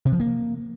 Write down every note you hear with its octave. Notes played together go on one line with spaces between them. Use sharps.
C3
F3
A#3